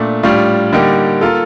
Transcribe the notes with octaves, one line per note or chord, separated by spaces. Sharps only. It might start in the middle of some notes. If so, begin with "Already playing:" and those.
Already playing: A#2 A3 D4
A2 G3 D4 F4
D3 G3 A#3 D#4 G4
A#3 F4 A4